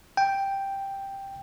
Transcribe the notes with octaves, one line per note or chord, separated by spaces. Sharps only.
G5